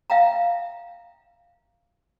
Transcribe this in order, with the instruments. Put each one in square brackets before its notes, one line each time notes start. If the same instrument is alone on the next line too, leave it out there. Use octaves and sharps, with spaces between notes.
[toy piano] E5 F5 G5 A#5